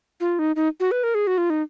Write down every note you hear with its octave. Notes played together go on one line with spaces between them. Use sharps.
F4
D#4
D#4
F#4
B4
A#4
G#4
F#4
F4
D#4